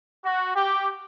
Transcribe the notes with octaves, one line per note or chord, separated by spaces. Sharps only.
F#4
G4